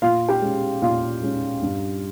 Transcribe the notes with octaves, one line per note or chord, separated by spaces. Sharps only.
A#2 F4 F5
G4 G5
G#3 C#4
A#2 F4 F5
G#3 C#4
G2